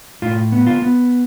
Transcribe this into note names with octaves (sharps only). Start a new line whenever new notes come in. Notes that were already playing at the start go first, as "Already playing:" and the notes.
A2 F4
B3
F4
B3